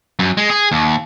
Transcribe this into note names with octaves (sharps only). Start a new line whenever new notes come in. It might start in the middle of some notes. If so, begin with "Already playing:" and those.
F#2
G#3
G#4
D#2